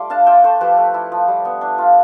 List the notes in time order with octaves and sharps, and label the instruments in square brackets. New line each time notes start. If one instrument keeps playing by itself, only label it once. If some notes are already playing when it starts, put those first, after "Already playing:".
Already playing: [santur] G3 A3 F4 C6 D6
D4 F5 A5
F4 E5 G5
A3 A4 C5
F3 G4 B4
A3
E4
F3
G3
B3
D4
F4